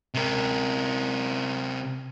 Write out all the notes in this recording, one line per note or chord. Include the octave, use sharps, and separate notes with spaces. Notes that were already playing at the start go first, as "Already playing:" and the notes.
C3 A#4